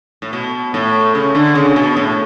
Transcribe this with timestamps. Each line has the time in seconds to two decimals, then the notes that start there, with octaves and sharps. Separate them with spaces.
0.22 A2
0.33 B2
0.74 A2
1.15 C#3
1.35 D3
1.55 C#3
1.76 B2
1.97 A2